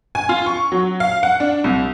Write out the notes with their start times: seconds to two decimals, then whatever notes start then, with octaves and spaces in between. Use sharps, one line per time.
0.15 G#5
0.29 F4
0.46 C#6
0.72 F#3
1.00 F5
1.23 F#5
1.40 D4
1.64 C2